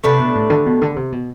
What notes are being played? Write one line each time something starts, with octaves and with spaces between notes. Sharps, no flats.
C3 A3 D4 G4 B4
B2
A2
D3
B2
D3
C3
B2